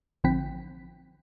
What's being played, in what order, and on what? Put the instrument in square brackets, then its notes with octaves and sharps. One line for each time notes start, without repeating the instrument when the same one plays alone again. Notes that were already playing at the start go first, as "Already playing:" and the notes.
[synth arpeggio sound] A1 D3 F3 C4 G5 B6